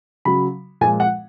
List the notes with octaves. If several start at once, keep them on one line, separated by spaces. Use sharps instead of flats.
C#3 F#3 B5
A#2 F3 G#3 G#5
F#5